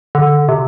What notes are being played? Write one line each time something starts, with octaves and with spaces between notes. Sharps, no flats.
D3
C3